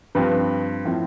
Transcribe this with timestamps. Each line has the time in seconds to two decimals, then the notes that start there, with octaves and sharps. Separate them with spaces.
0.15 G2 F3 C4 B4
0.85 A2 F3 C4